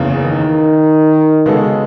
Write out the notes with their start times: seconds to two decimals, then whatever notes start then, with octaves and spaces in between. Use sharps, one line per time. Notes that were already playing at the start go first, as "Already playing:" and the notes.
Already playing: F#1 E2 C#3
0.22 D#3
1.46 C#3 G#3 B3 F#4 A4